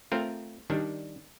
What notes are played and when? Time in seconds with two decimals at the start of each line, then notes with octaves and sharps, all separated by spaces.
0.12 A3 C4 F4 A#4
0.70 D#3 G3 D4